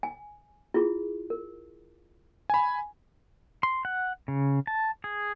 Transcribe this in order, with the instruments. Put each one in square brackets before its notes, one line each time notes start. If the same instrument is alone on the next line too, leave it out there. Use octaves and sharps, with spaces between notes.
[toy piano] G#5
E4 F4 G#4
A#4
[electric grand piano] G#5 B5
[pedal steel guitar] C6
F#5
C#3
A5
G#4